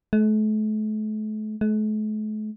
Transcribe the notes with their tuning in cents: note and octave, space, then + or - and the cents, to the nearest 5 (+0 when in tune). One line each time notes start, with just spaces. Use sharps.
A3 -40
A3 -45